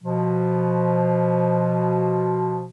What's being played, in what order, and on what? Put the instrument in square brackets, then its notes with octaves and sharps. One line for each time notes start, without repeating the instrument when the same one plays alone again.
[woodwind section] B2 F3